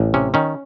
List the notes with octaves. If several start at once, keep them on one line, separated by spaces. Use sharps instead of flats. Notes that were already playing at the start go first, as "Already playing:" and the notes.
Already playing: A1
C3 C#4
D#3 C#4